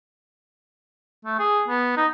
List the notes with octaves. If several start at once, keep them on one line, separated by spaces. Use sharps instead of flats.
A3
G#4
B3
D#4